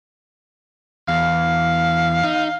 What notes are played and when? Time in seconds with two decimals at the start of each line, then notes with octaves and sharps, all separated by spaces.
1.08 E2 F5
2.24 D#4